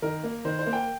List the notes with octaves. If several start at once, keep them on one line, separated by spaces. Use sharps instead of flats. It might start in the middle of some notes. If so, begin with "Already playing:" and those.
D#3 A#4
A#3
D#3 C5
C5
A#3
G5